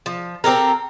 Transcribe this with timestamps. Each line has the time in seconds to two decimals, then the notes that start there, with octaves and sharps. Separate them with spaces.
0.06 F3
0.44 C4 G4 A4 A#4